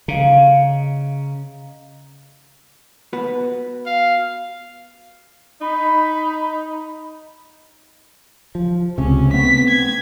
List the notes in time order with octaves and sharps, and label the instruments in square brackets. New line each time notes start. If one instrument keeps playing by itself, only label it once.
[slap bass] C#3 [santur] D#5 F5 A#5
[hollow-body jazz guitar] B3 F#4 B4
[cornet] F5
[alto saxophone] D#4 [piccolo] B5
[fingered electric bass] F3
[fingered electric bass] C#2 C3 [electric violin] C#4
[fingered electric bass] A3 B3 C4 [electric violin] B6
[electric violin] G#6